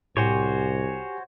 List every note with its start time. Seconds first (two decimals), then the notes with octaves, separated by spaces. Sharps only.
0.17 C2 A2 F#4 G4 C5 C#5 G#5